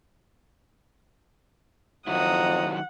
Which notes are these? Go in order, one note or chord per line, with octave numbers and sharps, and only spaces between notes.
F2 D#3 F#3 E4 F#5 A#5 D#6